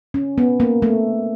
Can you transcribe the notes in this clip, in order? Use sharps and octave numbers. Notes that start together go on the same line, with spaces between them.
C#4
B3
A#3
A3